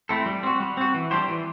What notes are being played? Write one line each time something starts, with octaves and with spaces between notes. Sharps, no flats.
A3 C4 E4 A4
G3
C4 F#4
G3
C4 F#4
E3
G3 D4 G4 C5
E3